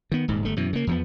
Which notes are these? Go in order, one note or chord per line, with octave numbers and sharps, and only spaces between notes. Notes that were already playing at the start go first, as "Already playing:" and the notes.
D#3 B3
D#1 G#2
G1 A3
F#2 B2 E3
C#3 A#3
E2 F3 B3